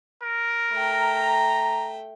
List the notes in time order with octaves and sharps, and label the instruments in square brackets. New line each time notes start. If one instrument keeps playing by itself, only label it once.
[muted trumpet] A#4
[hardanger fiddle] A3 G5 [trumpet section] A#5